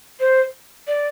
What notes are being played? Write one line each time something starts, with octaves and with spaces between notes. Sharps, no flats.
C5
D5